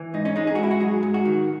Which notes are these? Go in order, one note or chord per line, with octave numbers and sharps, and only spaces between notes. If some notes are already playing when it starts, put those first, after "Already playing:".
Already playing: E3
G#2 D#4
C#4
G#3 D#4
G#4
F#4
G#2 E4
F#4
F#3 G#4
G#2
F#4
D#3